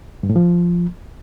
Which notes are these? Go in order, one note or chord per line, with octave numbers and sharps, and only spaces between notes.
G2
A2
F3